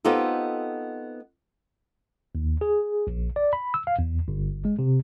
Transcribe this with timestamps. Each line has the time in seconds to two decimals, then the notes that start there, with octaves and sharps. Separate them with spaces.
0.05 B3 C4 D#4 F4 G4 A4
2.35 D#2
2.61 G#4
3.07 A#1
3.36 D5
3.53 B5
3.74 E6
3.87 F5
3.99 E2
4.28 G1
4.65 G#3
4.79 C3